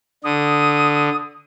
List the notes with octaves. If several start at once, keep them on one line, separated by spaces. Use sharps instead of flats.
D3 D#6